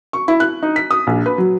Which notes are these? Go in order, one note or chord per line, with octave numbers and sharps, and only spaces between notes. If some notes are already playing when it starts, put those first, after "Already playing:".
C#6
E4
F#6
D#4
B6
D#6
A#1
B4
F#3